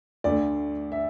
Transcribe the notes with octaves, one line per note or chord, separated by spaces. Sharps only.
D2 D3 A3 D5
E5